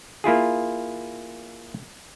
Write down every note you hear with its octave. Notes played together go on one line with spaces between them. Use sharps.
A#3 E4 F4 G#4